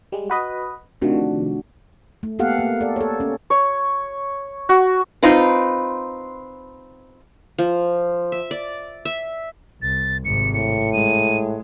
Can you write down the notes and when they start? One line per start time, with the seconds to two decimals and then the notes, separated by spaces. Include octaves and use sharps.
0.12 G3 G#3
0.30 F#4 B4 D#5
1.02 C3 D#3 F3 A3 D4 F#4
2.23 A3
2.39 A#3 B3 G4 A4 F5 F#5
2.59 A#3
2.81 A4 D5
2.96 A4 C#5
3.20 C#4
3.50 C#5
4.69 F#4
5.23 C4 D#4 F4 B4
7.58 F3
8.32 E5
8.51 D5
9.05 E5
9.82 C2 A6
10.24 G#1 C3 C#7
10.53 A2 C#7
10.93 G#3 D#7